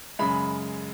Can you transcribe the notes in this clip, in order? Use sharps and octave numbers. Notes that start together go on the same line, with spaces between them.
F#2 C#3 G#3 B5